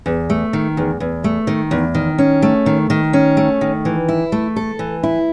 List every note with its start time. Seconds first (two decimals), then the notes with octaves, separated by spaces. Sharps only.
0.06 E2
0.30 A3
0.53 D#3
0.77 E2
1.00 E2
1.24 A3
1.47 D#3
1.71 E2
1.95 D#3
2.18 C#4
2.42 A3
2.66 D#3
2.90 D#3
3.13 C#4
3.37 A3
3.61 D#3
3.85 E3
4.08 E4
4.32 A3
4.56 A4
4.79 E3
5.03 E4